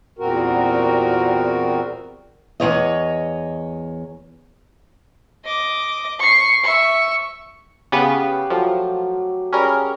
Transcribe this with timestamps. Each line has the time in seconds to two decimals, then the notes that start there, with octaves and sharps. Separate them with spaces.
0.19 E2 A#2 G3 C4 F#4 A#4
2.60 E2 E3 C#5 D#5
5.45 D#5 D6
6.19 C#6 C7
6.64 E5 C#6
7.92 C#3 B3 G4 B4 F5
8.50 F3 F#3 A3
9.53 G3 C#4 G#4 A#4 B5